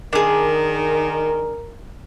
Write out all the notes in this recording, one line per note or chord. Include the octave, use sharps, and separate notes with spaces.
D#3 D4 G#4 A#4